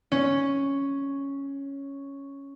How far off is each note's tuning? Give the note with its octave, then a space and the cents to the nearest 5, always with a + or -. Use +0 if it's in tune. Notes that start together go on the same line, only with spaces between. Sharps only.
C#4 +0